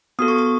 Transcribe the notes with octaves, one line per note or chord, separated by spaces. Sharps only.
B3 F#4 A4 D#6
C#6
D#6